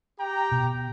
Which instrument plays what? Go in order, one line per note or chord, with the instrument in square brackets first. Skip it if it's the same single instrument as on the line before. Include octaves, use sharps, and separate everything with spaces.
[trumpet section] G4 G5 A#5
[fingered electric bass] B2